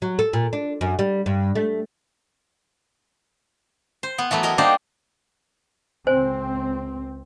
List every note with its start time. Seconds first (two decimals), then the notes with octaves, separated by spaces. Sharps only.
0.02 F#3
0.19 A4
0.33 A#2
0.53 D4
0.81 F#2
0.99 G3
1.26 G2
1.55 A3
4.03 C5
4.18 B3
4.31 E3 F#3 A3 B3
4.43 A#4 D#5 G#5 A#5
4.58 G3 A#3 D4 D#4 C5 D5
6.07 C#2 C4 C5 G#5